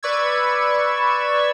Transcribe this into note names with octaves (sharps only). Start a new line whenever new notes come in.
B4 D5 C#6 E6 G#6